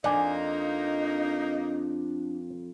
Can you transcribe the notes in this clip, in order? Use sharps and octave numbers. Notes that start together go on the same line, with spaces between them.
F2 A#3 D4 D#4 D5 G#5